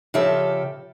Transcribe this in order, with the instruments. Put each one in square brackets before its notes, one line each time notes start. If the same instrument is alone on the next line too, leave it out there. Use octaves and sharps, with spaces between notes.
[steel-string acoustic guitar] C#3 F3 G4 A4 E5